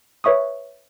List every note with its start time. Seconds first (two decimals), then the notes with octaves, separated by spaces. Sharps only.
0.24 B4 C#5 E5 C#6 D#6